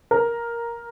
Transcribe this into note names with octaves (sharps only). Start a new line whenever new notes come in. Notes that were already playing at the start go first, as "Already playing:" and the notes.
A#4